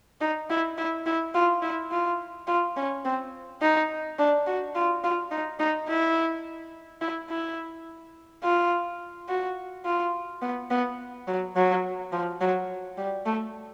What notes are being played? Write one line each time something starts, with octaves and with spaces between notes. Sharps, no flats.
D#4
E4
E4
E4
F4
E4
F4
F4
C#4
C4
D#4
D4
F#4
F4
F4
D#4
D#4
E4
E4
E4
F4
F#4
F4
B3
B3
F#3
F#3
F3
F#3
G3
A3